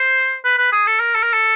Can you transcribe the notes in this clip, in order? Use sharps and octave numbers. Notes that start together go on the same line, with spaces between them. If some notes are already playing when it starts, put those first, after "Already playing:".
Already playing: C5
B4
B4
G#4
A4
A#4
A4
A#4
A4